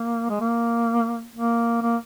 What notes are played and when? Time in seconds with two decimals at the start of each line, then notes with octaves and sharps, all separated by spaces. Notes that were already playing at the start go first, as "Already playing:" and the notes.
Already playing: A#3
0.30 G#3
0.40 A#3
1.35 A#3
1.82 A#3